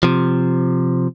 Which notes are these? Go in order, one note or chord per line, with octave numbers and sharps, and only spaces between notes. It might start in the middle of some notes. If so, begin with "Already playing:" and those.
C3 F3